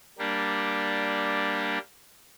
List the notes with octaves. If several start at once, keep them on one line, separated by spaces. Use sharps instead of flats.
G3 A#3 D4